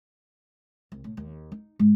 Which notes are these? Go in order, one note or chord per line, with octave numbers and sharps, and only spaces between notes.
C2
A2
D#2
D#4
G#2